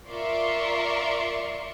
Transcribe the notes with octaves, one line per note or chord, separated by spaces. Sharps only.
F4 A#4 D5 E5 C6 C#6